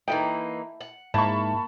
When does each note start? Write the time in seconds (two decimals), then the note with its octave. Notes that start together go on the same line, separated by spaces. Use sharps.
0.08 E3 A#3 D#4 E4 A4 G5
0.81 F#5
1.14 G#2 A#3 E4 A5 B5 C#6